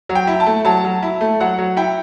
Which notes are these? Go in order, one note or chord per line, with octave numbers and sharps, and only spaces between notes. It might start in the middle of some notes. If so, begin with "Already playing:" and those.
F#3
G5
E4
A5
A3
F#3 A5
F#3
E4
A3
F#3 F#5
F#3
E4 G5